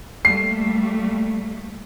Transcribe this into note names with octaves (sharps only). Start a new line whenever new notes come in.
G3 A3 A#3 C7